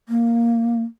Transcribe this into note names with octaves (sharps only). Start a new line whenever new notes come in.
A#3